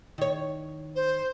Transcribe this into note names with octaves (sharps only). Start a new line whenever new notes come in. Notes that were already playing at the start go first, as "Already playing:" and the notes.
D#3 C#5
C5